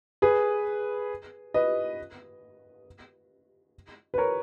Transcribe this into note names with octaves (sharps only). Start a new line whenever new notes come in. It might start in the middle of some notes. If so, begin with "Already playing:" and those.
G#4 B4
B4 D#5
B4
A#4 C#5